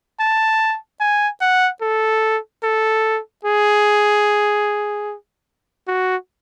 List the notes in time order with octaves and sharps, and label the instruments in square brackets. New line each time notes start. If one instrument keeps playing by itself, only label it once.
[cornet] A5
G#5
F#5
A4
A4
G#4
F#4